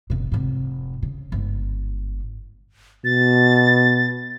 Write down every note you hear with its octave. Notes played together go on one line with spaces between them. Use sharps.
F#1 B2
F1 G#2
C#3
G1 G#2
B2 A6